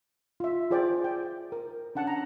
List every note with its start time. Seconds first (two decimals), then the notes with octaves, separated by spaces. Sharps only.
0.40 F4 E5
0.71 F4 G#4 C5 D5 G5
1.04 G5
1.52 A#4
1.95 C#4 D4 F#5 A5
2.07 A#5